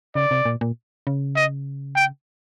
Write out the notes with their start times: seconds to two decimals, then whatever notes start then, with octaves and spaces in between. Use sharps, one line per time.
0.15 C#3 D5
0.31 C3
0.45 A#2
0.61 A#2
1.07 C#3
1.36 D#5
1.96 G5